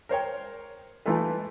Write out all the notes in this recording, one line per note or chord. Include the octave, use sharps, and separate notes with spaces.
A#4 C5 C#5 G5
E3 A3 D#4 F4 A4 B4